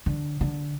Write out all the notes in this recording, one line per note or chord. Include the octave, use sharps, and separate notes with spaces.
D3
D3